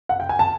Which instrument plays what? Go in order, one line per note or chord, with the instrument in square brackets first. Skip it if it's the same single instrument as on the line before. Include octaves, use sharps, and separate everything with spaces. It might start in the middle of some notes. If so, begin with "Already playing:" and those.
[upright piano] F#5
G5
G#5
A5